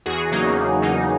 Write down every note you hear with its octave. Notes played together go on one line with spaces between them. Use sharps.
E2 F#4 G#4
C#3 F#3 A#3 D#4
E2
C#3 F#3 A#3 D#4